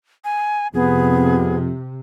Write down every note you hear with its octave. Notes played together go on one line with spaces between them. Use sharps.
G#5
F2 C3 B3 G#4